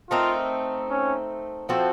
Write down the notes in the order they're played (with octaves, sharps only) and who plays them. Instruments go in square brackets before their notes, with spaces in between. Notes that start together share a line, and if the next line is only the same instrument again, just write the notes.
[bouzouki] A3 C4 D#4 A#4 [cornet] F4
[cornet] C#4
[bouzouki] F3 C4 F#4 A4